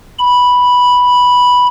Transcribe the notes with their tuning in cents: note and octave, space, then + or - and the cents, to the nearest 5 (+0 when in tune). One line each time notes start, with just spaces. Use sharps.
B5 -5